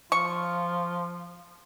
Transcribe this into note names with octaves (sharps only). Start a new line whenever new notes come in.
F3 F4 C#6